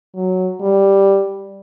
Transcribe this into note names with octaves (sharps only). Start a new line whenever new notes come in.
F#3
G3